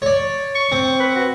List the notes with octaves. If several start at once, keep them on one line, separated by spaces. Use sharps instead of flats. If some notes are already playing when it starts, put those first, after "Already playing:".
C#5 D5
C#6
C4
B4
F#4